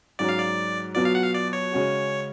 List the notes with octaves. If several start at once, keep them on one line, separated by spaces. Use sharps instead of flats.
G#2 F#3 C#4 D5
F5
D5
B2 F#3 B3 F4 D5
F5
F#5
F5
D5
C#5
C#3 G#3 C#4 F#4